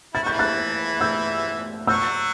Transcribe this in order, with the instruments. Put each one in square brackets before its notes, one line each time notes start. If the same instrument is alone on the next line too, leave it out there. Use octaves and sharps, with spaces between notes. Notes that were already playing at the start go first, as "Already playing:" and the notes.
[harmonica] E4 [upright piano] A6
[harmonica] F#4
[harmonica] E3 E4 [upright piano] G6
[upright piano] F#6 A6
E6 G6
[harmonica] F#3 F#4 [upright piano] E6 G6